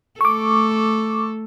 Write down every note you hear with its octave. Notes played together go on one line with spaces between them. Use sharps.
A3 A4 C#6 D6